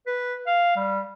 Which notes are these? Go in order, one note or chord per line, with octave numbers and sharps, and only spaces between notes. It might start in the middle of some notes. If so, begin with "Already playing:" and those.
B4
F5
G3